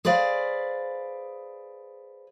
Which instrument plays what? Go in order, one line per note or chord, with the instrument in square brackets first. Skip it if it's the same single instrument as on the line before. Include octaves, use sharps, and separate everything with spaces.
[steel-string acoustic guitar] G#4 B4 C5 D5 F5